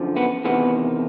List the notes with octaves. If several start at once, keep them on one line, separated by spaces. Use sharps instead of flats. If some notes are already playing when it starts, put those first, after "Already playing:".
Already playing: F#2 D3 F3
B3
E2 C3 D#3 B3